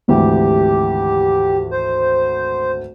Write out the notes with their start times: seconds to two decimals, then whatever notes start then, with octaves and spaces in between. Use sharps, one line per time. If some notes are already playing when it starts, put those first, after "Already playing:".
0.08 G#1 D2 E3 G4
1.71 C5